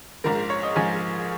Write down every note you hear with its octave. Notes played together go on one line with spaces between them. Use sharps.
A#1 G#2 F3 A#4
C#5
D#5
A#1 G#2 F3 G#5